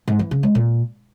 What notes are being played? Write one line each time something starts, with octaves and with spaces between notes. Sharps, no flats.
G#2
E3
C#3
G#3
A#2